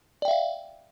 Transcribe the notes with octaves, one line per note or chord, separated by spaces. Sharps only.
D5 E5 F5 G5